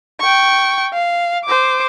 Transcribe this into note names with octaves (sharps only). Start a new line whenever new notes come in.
G5 C#6
F5
C5 D6